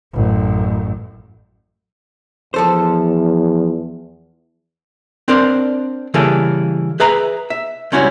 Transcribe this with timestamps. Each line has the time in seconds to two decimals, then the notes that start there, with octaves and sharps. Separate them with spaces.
0.13 A1 F#2
2.54 E2 F3 A4 C5
5.28 C4 D4 A#4 C5 D5
6.14 C#3 E3 G3 A#3 G#4 A4
7.00 G#4 B4 E5 A#5
7.50 E5
7.92 C#2 G3 C#4 E4 F#4 C#5